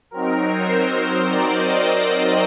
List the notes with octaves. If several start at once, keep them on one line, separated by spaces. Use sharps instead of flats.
F#3 C4 D#4 A#4
C5
C5
D5
D#5